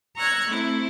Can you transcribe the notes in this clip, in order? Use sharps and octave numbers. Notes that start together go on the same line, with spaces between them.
A#5 C#6 E6 F#6 G#6
A3 C4 E4